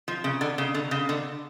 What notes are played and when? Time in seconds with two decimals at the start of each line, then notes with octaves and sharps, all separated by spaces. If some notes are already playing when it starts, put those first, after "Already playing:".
0.08 F3
0.24 C#3
0.41 D3
0.58 C#3
0.74 D3
0.91 C#3
1.09 D3